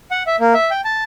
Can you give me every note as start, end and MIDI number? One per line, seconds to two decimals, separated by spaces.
0.11 0.23 78
0.27 0.36 76
0.40 0.54 58
0.54 0.70 76
0.71 0.81 79
0.85 1.04 81